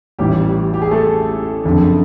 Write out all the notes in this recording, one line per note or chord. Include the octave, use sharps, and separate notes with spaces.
A1 A2 E3 G3 G4
G4
G#4
A3 A4
F#1 F2 D3